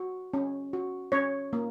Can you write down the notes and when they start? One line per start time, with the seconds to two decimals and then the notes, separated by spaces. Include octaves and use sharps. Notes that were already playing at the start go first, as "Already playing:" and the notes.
Already playing: F#4
0.34 C#4
0.73 F#4
1.12 C#4 C#5
1.53 A#3